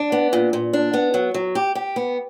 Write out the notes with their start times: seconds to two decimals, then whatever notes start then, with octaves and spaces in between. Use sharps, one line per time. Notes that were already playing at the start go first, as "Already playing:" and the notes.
Already playing: D4
0.12 B3
0.33 A#2
0.53 A#2
0.73 D4
0.94 B3
1.14 F#3
1.34 F#3
1.55 G4
1.75 G4
1.96 B3